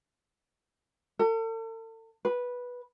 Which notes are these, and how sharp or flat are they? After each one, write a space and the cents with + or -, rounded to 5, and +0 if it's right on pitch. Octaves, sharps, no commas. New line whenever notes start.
A4 +40
B4 -10